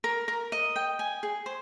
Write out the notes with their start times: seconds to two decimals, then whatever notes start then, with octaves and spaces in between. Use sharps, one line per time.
0.04 A#4
0.28 A#4
0.52 D#5
0.76 G5
0.99 G#5
1.23 G#4
1.46 C5